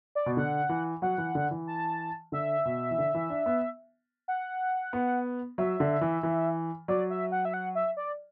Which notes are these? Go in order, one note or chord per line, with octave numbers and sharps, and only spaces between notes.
D5
B2
D3 F#5
E3
F#3 F#5
E3
D3
E3
A5
D3 E5
B2
E3
D3
E3
D4
B3
F#5
B3
F#3 E5
D3
E3
E3
F#3 D5
E5
F#5
E5
F#5
E5
D5